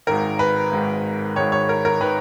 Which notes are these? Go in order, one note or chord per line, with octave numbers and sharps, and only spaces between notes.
G#1 G#2 D#3 A#4
B4
G#1 G#2 D#3
G#1 G#2 D#3 C#5
C#5
A#4
A#4
D#3 B4